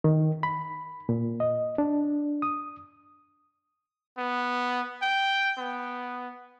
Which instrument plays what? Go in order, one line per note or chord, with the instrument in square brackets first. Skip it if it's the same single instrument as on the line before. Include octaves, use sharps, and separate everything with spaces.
[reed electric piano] D#3
B5
A#2
D#5
D4
D#6
[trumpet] B3
G5
B3